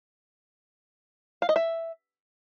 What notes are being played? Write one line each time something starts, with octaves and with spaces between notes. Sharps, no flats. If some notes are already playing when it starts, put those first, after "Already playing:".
F5
D#5
E5